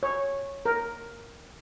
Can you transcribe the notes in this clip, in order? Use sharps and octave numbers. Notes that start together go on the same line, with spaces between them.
C#5
A#4